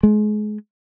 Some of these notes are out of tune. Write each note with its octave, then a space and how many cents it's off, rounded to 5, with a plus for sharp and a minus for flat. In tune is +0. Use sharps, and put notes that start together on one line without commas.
G#3 +30